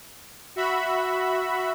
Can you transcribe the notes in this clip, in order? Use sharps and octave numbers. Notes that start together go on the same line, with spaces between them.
F#4 E5 B5